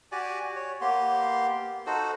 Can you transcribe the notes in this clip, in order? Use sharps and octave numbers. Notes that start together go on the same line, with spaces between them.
F#4 G4 D5 G#5
C#5
A#3 B3 G4 C6
D#4 F#4 A4 C5